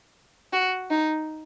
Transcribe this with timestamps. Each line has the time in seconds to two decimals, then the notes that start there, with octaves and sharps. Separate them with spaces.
0.53 F#4
0.91 D#4